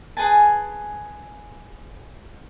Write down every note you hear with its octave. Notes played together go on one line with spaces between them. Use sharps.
G#4 B4 G#5 A5